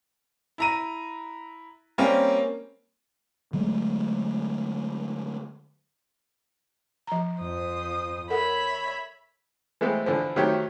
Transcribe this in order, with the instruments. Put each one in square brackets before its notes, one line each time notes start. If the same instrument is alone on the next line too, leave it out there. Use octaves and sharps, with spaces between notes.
[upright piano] E4 A#5 D#7
G3 A#3 C4 C#4
[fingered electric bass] D3 F#3 G#3 A3
[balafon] F3 A#5
[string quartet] F2 C5 D#6
[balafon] A4 A#4 F#5 [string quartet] C#5 E5 B5
[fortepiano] E3 G#3 A3 B3 C4
D3 E3 F3
D#3 F#3 A3 C4 G4 C#5